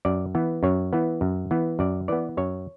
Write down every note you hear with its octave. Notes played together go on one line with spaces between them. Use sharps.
F#2 D5
E3 B3
F#2 C#5
E3 B3
F#2
E3 B3
F#2 D5
E3 B3 D5
F#2 C#5